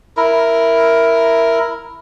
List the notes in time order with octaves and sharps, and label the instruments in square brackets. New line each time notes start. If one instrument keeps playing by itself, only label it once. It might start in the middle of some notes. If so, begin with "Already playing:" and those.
[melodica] E4 A#4